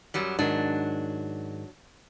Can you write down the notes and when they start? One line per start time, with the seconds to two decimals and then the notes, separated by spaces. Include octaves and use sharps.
0.14 F#2 F#3 G3
0.39 G#2 D#3 F#3 D4